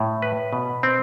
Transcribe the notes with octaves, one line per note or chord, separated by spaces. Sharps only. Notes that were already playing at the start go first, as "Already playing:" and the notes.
Already playing: A2
B4
B2
C4